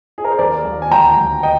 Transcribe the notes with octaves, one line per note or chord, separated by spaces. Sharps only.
G#4
A#4
C5
D#2 A#4 D5
D#2
G#5
D2 G5 A#5
D2
D#5 G5